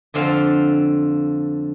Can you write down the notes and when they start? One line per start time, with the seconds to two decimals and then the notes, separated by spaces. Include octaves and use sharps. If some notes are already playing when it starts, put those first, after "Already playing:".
0.14 F2 D3 C4 F5